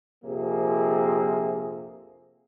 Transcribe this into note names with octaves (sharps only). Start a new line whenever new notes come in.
A#1 F2 C3 F3 A#3 G#4